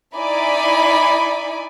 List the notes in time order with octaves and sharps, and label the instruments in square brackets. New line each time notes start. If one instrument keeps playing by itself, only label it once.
[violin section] D#4 E4 D5 G#5 B5 D6